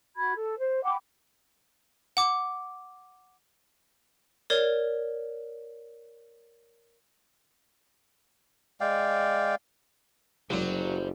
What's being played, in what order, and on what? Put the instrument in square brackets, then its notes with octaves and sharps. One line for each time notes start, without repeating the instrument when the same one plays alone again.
[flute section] F#4 B5 G#6
A4
C5
F#5 G5 B5 D6
[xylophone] F#5 D6
A#4 C#5 D5
[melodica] G#3 D5 F5 G5
[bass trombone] F#1 [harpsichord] C2 F#2 [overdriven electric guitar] F#3 [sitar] G3 C4